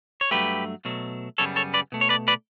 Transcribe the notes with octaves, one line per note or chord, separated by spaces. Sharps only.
C#5
G2 F#3 A3 G4 B4
B2 F#3 A3
F#2 C#3 G3 B3 A4 C#5
A4 C#5
B4 D5
B2 A3
C#5
B4 D5
B4 D5